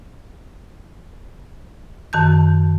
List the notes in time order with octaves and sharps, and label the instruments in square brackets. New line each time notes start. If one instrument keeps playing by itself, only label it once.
[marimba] F#2 D#3 A5 G6